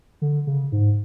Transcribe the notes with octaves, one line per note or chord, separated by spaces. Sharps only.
D3
C#3
G#2